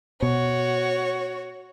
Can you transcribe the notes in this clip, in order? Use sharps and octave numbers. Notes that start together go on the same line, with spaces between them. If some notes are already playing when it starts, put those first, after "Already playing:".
B2 F#4 C#5